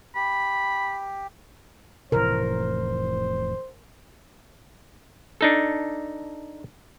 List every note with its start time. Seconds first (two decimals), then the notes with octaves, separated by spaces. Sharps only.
0.15 G4 B5
2.12 F1 A2 E3 A#4 C5
5.41 D4 D#4 A4